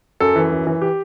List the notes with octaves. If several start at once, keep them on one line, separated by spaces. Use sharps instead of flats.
F#2 A4
E3
F#2
E3
G4